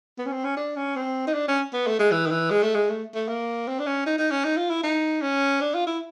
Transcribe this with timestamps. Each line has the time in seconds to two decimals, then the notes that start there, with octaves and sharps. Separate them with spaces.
0.19 B3
0.26 C#4
0.32 C4
0.44 C#4
0.57 D4
0.76 C#4
0.96 C4
1.27 D#4
1.34 D4
1.48 C#4
1.73 B3
1.87 A3
1.99 G#3
2.11 E3
2.26 D#3
2.31 E3
2.50 G#3
2.62 A3
2.75 G#3
2.89 A3
3.15 A3
3.28 A#3
3.68 C4
3.79 D4
3.86 C#4
4.06 D#4
4.18 D#4
4.31 C#4
4.45 D#4
4.57 F4
4.70 E4
4.83 D#4
5.22 C#4
5.61 D4
5.74 F4
5.87 E4